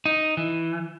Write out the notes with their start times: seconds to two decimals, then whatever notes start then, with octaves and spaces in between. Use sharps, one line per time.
0.06 D#4
0.37 E3